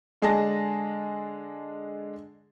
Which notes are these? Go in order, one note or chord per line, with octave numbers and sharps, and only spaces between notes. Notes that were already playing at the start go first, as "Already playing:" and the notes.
D3 G#3 D4 G#4 A5 A#6